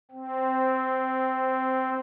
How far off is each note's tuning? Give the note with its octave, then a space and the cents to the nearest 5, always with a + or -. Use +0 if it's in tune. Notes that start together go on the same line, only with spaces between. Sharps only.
C4 -10